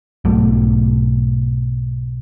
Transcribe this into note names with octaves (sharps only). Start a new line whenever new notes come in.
B1 G#2 F#3 A3